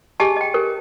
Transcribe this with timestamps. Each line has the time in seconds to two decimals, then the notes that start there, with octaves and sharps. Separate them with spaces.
0.20 G4 G#4 D#5 G#5 A5
0.36 D#5 G5
0.54 G4 A#4 C5